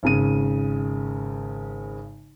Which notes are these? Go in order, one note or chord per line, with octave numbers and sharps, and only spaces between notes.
G#1 C#3 D#7